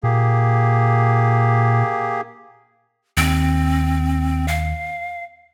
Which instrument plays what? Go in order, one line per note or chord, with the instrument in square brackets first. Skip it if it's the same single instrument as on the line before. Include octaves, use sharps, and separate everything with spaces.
[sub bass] A#2 [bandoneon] A#3 G4 G#4
[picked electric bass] D#2 [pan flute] C4
[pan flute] F5